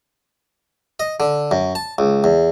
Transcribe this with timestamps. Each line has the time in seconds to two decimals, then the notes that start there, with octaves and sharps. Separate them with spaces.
1.00 D#5
1.20 D3
1.51 F#2
1.75 A5
1.98 C#2
2.24 E2